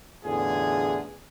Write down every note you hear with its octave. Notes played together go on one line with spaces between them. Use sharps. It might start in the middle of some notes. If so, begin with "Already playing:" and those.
A1 E2 D3 F4 G#4